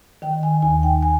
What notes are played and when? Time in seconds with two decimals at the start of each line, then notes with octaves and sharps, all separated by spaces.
0.22 D#3 G5
0.43 G#5
0.62 D#2 G#5
0.83 G5
1.03 G#5